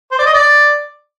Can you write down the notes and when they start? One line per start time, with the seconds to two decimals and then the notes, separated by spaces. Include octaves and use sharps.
0.12 C5
0.19 D5
0.26 D#5
0.33 D5